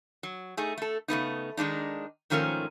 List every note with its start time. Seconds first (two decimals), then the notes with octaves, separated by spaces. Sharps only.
0.23 F#3
0.57 A3 D#4 G#4
0.78 A3 A4
1.08 C#3 A3 B3 D#4
1.57 D#3 G#3 D4 D#4
2.30 G#2 D#3 F3 A3 C#4 A#4